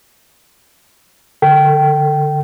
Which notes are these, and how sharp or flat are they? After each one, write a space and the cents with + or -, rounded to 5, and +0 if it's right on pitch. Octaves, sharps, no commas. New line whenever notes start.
D3 -5 A4 +25 G5 -20